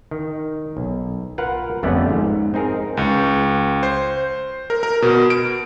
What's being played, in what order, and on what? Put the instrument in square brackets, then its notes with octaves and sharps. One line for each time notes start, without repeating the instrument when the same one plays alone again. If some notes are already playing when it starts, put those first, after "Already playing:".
[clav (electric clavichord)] D#3
B1
F4 A#4 B4 F5 F#5
G1 F2 A3 B3 C#4 D5
G#2
C4 D#4 G#4 A#4
[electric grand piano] C#2
C5
A#4
A#4
B2
D7